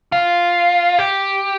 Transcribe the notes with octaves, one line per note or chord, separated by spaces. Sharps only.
F4
G4